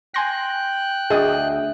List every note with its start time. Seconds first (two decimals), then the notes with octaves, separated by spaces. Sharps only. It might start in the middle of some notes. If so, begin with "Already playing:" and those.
0.14 G5 G#5 C6 F#6 A#6
1.10 D2 G#4 D#5 D#6